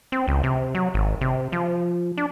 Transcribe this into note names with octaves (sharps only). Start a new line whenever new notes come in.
C4
C#2
C3
F#3
G#1
C3
F3
D4